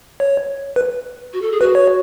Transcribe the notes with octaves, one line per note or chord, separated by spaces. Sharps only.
C#5
B4
F#4
A4
G#4
F#4 B4
C#5